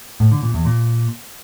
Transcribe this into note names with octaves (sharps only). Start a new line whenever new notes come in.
A2
D3
A#2
E2
A#2